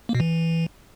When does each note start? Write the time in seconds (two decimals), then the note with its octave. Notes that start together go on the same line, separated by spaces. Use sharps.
0.09 A#3
0.15 B2
0.20 E3